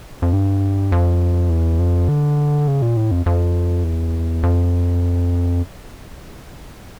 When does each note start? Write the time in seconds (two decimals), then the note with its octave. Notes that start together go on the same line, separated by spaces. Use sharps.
0.22 F2
0.33 G2
0.92 F2
1.50 E2
1.79 F2
2.09 D3
2.68 C#3
2.82 A#2
2.97 A2
3.11 F2
3.26 F2
3.84 E2
4.43 F2